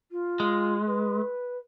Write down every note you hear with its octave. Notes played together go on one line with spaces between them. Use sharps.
F4
G#3
B4